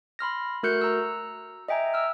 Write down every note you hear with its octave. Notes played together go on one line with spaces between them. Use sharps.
B5 C6 F6 A#6
A3 F#4 A#4 F#6 G6 C#7
A#5 E6
D#5 E5 G5 G#5 A#5
E6 F6